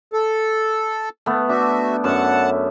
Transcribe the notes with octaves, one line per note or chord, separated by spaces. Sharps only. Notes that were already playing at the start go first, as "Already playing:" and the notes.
A4
A3 B3
D4 F#4 E5
F#2 E5 F#5 A5